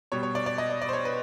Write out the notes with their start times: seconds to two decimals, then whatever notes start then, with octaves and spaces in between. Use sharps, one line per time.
0.12 B2 G3 C#5
0.23 C#5
0.35 D5
0.46 D5
0.58 D#5
0.70 D5
0.81 D5
0.89 C5
0.93 C#5
1.05 B4